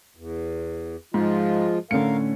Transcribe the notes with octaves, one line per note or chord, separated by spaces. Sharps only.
E2
G#2 F3 G#3 F4
A2 D3 C#4 A#4 F5 C#7